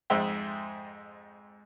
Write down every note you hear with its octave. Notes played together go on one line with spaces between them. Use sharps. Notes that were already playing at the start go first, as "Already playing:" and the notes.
F2 G#2 G#3 C5 E5 G5